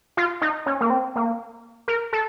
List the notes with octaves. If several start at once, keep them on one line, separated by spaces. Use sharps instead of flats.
F4
D#4
C#4
A#3
C4
A#3
A#4
A4